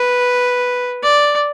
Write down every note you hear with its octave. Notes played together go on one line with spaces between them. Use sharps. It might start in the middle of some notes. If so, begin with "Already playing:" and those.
Already playing: B4
D5